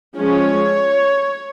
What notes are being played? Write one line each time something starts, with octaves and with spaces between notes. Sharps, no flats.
F3 G#3 C#4 C#5